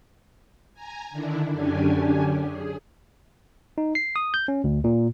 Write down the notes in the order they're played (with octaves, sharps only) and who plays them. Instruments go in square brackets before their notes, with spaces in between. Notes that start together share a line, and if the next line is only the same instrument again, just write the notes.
[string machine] G#5 A#5
D3 D#3 D4 E4
F#2 D3 C#4 D4 G4 G#5
G#4
[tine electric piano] D#4
C7
D#6
G6
C#4
D2
A#2